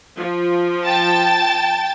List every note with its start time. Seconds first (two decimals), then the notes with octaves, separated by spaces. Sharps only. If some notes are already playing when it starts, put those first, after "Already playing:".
0.15 F3
0.85 G5 A5 A6